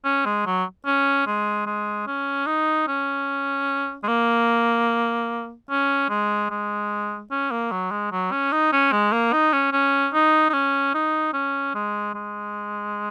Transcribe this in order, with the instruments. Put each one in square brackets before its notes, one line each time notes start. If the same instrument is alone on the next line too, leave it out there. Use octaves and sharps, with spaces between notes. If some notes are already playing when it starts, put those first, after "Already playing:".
[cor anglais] C#4
G#3
F#3
C#4
G#3
G#3
C#4
D#4
C#4
G#3
A#3
C#4
G#3
G#3
C#4
A#3
F#3
G#3
F#3
C#4
D#4
C#4
G#3
A#3
D#4
C#4
C#4
D#4
D#4
C#4
D#4
C#4
G#3
G#3